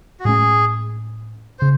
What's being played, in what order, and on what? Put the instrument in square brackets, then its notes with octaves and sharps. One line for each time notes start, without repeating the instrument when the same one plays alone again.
[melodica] F#4
[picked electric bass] A2 G#3 C#4 [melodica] G#4
[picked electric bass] C#3 [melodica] C5